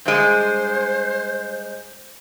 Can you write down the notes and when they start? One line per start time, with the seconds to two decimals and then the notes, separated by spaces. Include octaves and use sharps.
0.06 G2 G#3 C5